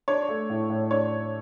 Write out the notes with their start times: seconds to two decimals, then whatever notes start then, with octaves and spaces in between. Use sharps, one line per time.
0.08 D4 C#5
0.29 A3
0.50 A2
0.70 A2
0.91 D4 C#5